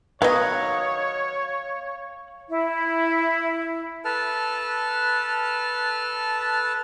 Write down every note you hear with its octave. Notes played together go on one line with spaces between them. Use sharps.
D#3 F#3 B3 C#5 D#5 F5 F#6
E4
A4 B4 A5 F6